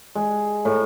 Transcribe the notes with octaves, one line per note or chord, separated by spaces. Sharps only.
G#3
A2